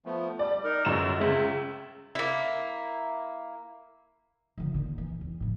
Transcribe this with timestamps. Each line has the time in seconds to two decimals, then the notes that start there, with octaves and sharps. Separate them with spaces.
0.06 F3 A3 B3
0.39 G3 D5
0.64 D#4 A#4
0.85 G1 F#2 G#3 E7
1.20 C#2 C#3 E5
2.15 A#3 E4
4.58 D3 F3
4.74 A#2 D#3
4.98 E3
5.21 E2
5.40 A2 F3